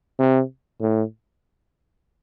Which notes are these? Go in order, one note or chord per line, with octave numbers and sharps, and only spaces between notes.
C3
A2